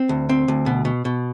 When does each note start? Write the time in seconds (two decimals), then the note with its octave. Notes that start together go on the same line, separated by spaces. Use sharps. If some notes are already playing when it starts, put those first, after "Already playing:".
Already playing: C4
0.09 D2
0.29 C4
0.48 D2
0.66 B2
0.85 B2
1.05 B2